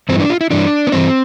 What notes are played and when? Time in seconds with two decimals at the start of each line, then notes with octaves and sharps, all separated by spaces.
0.09 G2 E3 C4
0.20 D4
0.30 F4
0.41 E4
0.50 G2 E3 D4
0.87 B3
0.92 G2 E3 C4